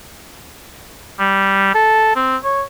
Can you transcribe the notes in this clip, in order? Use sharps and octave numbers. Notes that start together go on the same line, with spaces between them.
G3
A4
C4
C#5